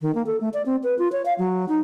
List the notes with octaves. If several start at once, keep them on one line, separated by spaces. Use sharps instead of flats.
D#3
A#3
A4
A3
D5
C4
B4
F4
C#5
F5
F#3
D#4